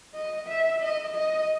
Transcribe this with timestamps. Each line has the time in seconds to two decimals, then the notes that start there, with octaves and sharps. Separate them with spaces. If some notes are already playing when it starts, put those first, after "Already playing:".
0.14 D#5
0.48 E5
0.82 D#5
1.16 D#5